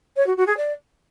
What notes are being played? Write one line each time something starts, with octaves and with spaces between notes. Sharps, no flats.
C#5
F#4
F#4
G#4
D5